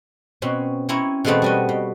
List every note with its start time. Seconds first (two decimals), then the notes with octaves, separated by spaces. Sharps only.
0.42 B2 C4 C#4
0.89 C4 C#4 E4 C#5 A#5
1.25 B2 E3 G#3 A3 B3 C4
1.42 G3 F#4 D#5
1.69 B2